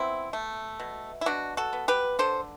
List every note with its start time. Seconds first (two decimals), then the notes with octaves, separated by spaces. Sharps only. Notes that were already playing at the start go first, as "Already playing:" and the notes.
Already playing: B3 C4 E4
0.33 A3
0.80 B2
1.21 E4
1.26 B2 D4 F#4
1.57 F#4 A4
1.73 B3
1.88 G4 B4
2.19 D3 A4 C5